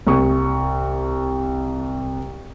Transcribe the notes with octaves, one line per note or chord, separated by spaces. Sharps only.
C2 C#6